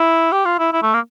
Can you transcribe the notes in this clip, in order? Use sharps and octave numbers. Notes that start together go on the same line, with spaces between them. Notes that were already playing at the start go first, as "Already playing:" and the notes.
Already playing: E4
G4
F4
E4
E4
A3
A#3